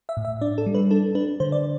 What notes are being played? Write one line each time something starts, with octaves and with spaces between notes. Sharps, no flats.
E5
A2
E5
D4 D5
A4
G3
B4
D4 A4
D4 B4
D3 C5
D5